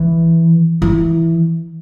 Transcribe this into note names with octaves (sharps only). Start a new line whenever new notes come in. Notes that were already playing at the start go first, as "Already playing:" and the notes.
Already playing: E3
E3